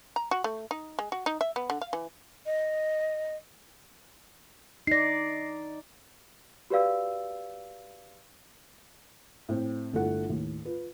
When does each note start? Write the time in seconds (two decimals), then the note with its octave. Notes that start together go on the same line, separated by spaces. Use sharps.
0.16 A#5
0.31 F#4
0.44 A3
0.71 D#4
0.99 G#3
1.12 F#4
1.26 D#4
1.41 E5
1.56 B3
1.70 D3
1.81 F5
1.93 E3
2.45 D#5
4.87 D#4 D5 A#6 C7
6.70 F#4 G4 B4 D5 F5 E6
9.49 A2 C4
9.93 G1 A3 E4 F4 A4 F#5
10.29 D#2 A2
10.65 F4 B4